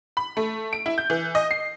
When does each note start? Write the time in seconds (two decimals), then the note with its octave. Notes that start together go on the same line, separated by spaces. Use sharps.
0.17 B5
0.37 A3
0.73 D7
0.86 E4
0.98 G6
1.10 E3
1.35 D#5
1.51 C7